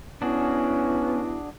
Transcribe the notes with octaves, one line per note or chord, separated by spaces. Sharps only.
B3 C#4 D4 E4 F#4 G#4